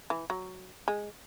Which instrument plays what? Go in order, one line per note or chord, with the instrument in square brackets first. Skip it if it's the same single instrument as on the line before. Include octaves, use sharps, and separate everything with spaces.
[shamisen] E3
F#3
G#3